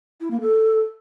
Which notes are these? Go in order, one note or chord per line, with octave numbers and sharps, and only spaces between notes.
E4
A#3
A4